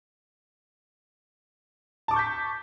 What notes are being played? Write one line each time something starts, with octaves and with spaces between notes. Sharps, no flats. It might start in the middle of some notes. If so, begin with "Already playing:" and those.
A5 C#6 D6 G6 B6